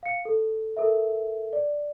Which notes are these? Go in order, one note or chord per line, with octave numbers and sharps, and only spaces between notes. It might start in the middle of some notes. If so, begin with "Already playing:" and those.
F5 C#7
A4
A4 A#4 E5
D5